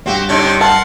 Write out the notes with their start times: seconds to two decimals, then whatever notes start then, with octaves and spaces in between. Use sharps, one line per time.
0.06 D2 G2 C4 F#4 G4
0.29 C#3 G3 C4 D4 D#4 C#5
0.61 A#4 F#5 A5 C6